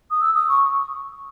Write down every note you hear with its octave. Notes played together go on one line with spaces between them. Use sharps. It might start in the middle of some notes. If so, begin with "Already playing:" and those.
D#6
E6
D#6
C#6